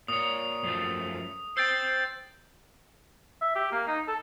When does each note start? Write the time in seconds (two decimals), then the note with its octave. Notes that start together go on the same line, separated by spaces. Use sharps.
0.08 A#2 C#5 D#6
0.64 F#2 F3 A3
1.57 C5 G5 E6 G6 A6
3.41 E5
3.56 G4
3.72 A#3
3.87 D#4
4.08 A4